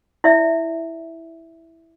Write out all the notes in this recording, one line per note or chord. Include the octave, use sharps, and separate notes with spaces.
E4 D5 E5